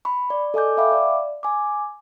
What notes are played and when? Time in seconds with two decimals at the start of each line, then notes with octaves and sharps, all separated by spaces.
0.05 B5 C#6
0.30 D5
0.54 A4 D#5 G#5 D6 G6
0.77 E5 F5 G5 B5 D6
0.92 D5
1.43 G#5 D6